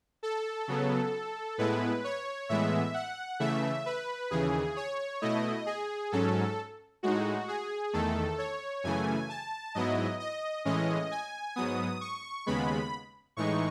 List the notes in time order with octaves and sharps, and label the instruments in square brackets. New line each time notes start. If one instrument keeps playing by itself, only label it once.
[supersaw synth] A4
C#3 F#3 B3
A2 G#3 B3 E4 B4
C#5
A2 E3 G#3 B3 E5
F#5
C#3 E3 A3 E5
B4
D#2 C#3 E3 G#4
C#5
B2 A3 E4 D#5
G#4
G#2 F#3 C#4 A4
A2 G#3 D#4 F#4
G#4
E2 D#3 A3 A4
C#5
F#2 C#3 E3 A3 G#5
A5
G#2 F#3 B3 E4 D#5
D#5
A2 E3 G#3 C#4 D#5
G#5
G#2 F#3 B3 D#6
C#6
D#2 C#3 G#3 B3 B5
A2 E3 G#3 D#4 C#6